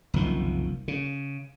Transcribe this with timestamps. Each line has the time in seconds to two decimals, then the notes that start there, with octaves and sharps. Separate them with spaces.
0.14 F#1 C2 D#3 F3
0.88 C#3